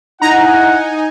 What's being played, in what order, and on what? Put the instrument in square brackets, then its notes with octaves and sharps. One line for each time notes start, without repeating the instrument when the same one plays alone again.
[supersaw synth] D#4 G#5 [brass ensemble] E4 F#5 [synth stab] A#5